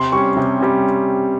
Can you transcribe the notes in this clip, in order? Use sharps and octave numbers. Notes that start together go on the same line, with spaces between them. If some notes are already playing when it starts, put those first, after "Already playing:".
Already playing: C3 C6
G3 C#4 C#6
C3
G3 C#4